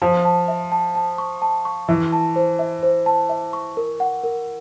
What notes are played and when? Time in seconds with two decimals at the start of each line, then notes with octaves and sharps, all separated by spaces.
0.02 F3 A5
0.25 A5
0.48 E5
0.72 A5
0.95 A5
1.18 C#6
1.42 A5
1.65 C#6
1.88 E3 E5
2.12 A5
2.36 C5
2.59 E5
2.83 C5
3.06 A5
3.29 E5
3.53 C#6
3.77 A#4
4.00 F#5
4.24 A#4